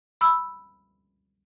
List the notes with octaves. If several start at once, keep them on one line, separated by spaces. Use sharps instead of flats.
B5 E6